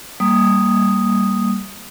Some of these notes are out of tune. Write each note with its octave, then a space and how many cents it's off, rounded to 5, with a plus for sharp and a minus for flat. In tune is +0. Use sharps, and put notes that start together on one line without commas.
G3 +0 A#3 +0 D#6 +0